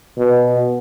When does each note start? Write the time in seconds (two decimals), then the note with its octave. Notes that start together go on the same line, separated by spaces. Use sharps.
0.18 B2